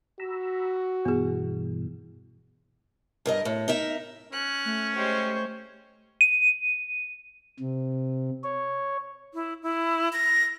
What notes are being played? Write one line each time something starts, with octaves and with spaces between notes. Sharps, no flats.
F#4 A#5 B5 E6
G2 B2 E3 B3 G#4
G2 A#4 D#5
A2
D#4 A#4 E5
C#4 F#6
A3
G#3 G4 C5 C#5
D#7
C3
C#5
E4
E4
A#6